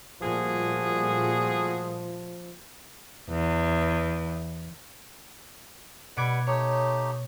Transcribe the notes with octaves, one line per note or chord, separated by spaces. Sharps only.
A#2 F3 G3 A3 F#4 G#4
E2
B2 G3 B4 F#5 D6 G#6
A3 D#4 G4 C#5